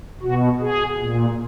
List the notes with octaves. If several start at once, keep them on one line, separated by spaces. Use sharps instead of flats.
B2 F#4
G#4
A#2